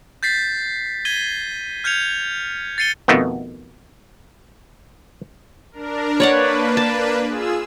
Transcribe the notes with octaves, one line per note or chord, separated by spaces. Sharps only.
G6 A6 B6 C7
G#6 B6 D#7 G7
F6 G6 G#6 C#7 F7
A6 C7 C#7 D#7 G7
F2 B2 D#3 A3 B3
D4 A#4
A#3 D4 B4 C#5 D5 F#5
A5
F4 G#4 E6